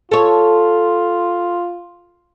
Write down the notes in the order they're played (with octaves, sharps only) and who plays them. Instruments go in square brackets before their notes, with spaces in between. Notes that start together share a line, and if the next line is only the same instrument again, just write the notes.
[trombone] F4 [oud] A4 C#5